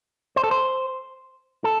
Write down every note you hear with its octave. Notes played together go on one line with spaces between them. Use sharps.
C5
A4
C5
A4